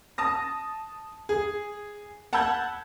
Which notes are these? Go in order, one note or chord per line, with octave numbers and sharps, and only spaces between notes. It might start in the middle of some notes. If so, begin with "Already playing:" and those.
A5 D#6 A#6
G#4
F#5 A5 B5 E6 G6 G#6